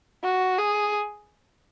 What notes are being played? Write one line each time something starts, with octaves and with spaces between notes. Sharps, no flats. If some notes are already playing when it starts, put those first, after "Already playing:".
F#4
G#4